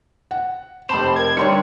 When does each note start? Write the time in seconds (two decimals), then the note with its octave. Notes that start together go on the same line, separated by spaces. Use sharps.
0.31 F#5
0.89 F1 C4 C5 A5 B5 E7
1.16 A#4 G#6
1.37 D3 G3 D4 D#4 C#5 C6 C#7